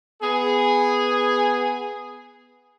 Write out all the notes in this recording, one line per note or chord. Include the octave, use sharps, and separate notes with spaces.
B3 G#4